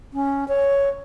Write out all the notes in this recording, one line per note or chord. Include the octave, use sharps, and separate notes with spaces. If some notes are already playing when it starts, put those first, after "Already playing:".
C#4
C#5